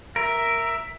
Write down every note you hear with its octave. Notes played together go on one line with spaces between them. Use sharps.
A#4 E5